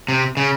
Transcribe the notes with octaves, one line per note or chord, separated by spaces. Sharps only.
C3
C#3